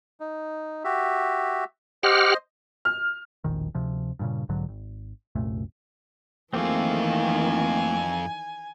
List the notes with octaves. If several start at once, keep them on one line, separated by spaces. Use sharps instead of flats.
D#4
F#4 G4 E5
G4 C5 D#5 F#5 F6
F6
E1 A#1 D#3
D2 C3 F3
G2 A#2 C#3
B1 G#2 D3 F#3
G#1
C2 F#2 A#2 A3
F2 D#3 E3 A3 A#3 C4 F4 G#4
G#5